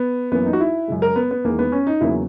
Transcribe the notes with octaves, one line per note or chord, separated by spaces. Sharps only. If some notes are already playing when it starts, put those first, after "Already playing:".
Already playing: B3
F#2 E3 A#3 B3
D#4
F#4
E4
F#2 C#3 G#3
A#4
B3
B3
E2 D#3 G#3 A#3
B3
C#4
D#4
E2 C#3 F#3 A#3 E4